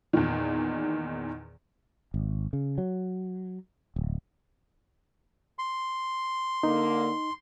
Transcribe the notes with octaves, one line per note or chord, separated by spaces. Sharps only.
E2 A#2 D#3
G#1
C#3
F#3
D1
C6
D3 A#3 D#4